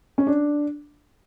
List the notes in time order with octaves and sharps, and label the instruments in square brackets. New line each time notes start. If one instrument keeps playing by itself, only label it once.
[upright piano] C#4
D4